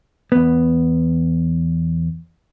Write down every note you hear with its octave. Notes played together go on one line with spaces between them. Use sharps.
E2 B3